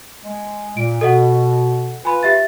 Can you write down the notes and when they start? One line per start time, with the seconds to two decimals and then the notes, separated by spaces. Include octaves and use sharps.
0.25 G#3
0.77 A#2 D7
1.01 B2 A4 D#5 F#5
2.05 F4 B4 G#5 B5
2.23 G4 E5 A6